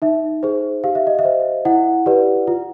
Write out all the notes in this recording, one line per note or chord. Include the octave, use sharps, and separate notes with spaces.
D#4 E5
G#4 C5
G4 F5
E5
D#5
E5
C5
E4 F#5
G4 B4 D5
F4